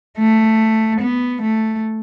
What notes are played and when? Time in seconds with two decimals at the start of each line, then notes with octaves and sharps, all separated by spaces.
0.18 A3
1.01 B3
1.42 A3